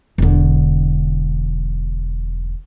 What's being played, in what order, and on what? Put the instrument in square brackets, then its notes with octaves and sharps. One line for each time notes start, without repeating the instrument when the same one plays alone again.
[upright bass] E1 D3